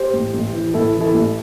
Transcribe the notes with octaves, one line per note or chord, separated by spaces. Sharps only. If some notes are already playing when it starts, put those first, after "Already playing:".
Already playing: G4 C5
A1
A1
E3
A2 E4 A4
E3
E4 A4
A1